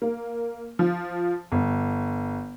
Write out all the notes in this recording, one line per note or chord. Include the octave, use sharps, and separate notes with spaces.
A#3
F3
G1